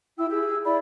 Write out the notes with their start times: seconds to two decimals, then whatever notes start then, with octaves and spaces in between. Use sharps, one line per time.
0.18 E4 G5 E6
0.30 G4 G#4 E6
0.64 E4 D5 B5